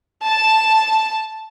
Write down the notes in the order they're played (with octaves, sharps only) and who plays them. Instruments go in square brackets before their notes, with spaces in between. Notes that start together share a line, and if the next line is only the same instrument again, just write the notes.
[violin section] A5